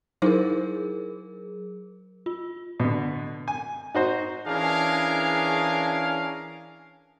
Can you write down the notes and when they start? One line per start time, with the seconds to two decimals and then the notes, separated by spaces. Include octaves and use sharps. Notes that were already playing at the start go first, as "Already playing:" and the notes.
0.22 F#3 D#4 E4 G#4 A#4 C5
2.26 F4
2.80 B2 D3
3.48 G#5
3.95 D#4 F#4 C5
4.46 E3 C#4 D4 G#4 A#4 F5